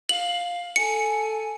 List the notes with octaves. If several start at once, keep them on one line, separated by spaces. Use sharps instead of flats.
F5 F#7
A4 G#5 C#7